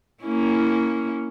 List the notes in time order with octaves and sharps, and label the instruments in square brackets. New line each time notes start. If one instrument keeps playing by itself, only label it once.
[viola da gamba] A#3 C#4 E4